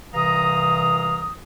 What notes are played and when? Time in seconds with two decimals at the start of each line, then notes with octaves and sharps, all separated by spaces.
0.13 C2 C3 E3 F5 A#5 D#6